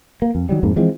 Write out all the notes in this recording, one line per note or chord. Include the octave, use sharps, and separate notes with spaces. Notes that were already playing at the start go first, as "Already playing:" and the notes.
A#3
F2
D#3 F#3 G3
F2 G#2 A#3
E3 F3 G#3 C4